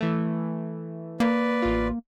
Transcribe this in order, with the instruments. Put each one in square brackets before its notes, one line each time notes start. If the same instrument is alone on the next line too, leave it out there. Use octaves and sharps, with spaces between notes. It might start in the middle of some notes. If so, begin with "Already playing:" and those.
[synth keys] E3 A3
[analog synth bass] A#3 [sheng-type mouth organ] B4 D5
[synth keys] A1 F4